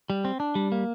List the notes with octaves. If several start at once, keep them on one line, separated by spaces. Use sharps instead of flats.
G3
C4
D4
G3
A#3